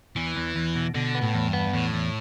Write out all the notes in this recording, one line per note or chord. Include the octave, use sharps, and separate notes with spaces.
E2 E3
E2
E2
B2
B2 D3
B3
A2
E2
G2
B3
E2 A2
E2